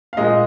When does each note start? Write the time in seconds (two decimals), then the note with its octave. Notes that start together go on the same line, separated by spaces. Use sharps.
0.13 F5
0.17 A#2 G#3 D#5